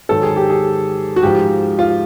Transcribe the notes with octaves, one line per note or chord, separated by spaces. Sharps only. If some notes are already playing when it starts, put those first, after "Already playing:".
G#2 D#3 F#3 A4
G#4
G4
G#4
F#4
G#2 F3 G4
F4